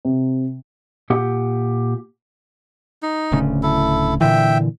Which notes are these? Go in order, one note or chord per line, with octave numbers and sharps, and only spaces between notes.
C3
A#2 G4 F#5
D#4
D1 D2 C#3
E4 A4
A#2 D3 E3 E5 G5